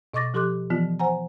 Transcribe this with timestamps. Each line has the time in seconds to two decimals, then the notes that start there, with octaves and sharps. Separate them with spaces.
0.14 B2 D#5 C#6 D6 A6 A#6
0.34 F3 G4 A4 C6 D6 F#6
0.70 E3 F3 B3 F4
0.99 C5 F#5 G#5 A#5